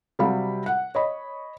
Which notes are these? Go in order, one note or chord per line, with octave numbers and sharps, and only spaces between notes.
C3 F#3 G3 F5 B5
F#5
C#5 D#5 B5